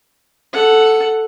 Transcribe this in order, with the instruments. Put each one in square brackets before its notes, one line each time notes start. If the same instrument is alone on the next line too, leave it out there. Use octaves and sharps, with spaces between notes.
[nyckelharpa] A4 F#5